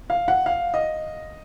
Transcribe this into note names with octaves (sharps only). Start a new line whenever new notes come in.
F5
F#5
F5
D#5